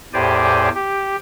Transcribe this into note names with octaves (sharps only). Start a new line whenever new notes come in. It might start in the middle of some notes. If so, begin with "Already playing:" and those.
E2 A2 G4 C5 D5 G#5
G4